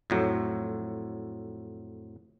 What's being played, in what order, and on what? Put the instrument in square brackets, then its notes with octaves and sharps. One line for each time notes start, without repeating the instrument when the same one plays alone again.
[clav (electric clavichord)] F2 A2 F#3